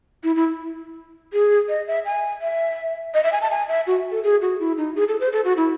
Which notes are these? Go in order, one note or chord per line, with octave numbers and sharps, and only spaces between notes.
E4
E4
G#4
D#5
E5
G#5
E5
D#5
E5
G#5
A5
G#5
E5
F#4
A4
G#4
F#4
E4
D#4
G#4
A4
C5
A4
F#4
E4